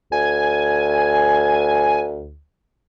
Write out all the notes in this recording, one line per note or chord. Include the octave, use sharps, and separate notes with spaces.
D2 G#5